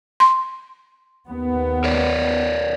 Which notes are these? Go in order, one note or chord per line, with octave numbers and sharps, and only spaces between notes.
C6
D#2 B3
A#4 C#5 D5